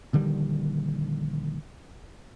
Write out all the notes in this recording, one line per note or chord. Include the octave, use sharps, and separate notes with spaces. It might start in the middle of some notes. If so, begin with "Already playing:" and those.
A#1 D3 D#3 G3